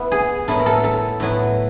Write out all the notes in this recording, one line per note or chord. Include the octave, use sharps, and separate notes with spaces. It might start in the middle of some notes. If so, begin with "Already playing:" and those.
Already playing: B3 E4
G#4
A2 F#3 B3 E4 A4
A#4
A4
A4
A2 F#3 B3 E4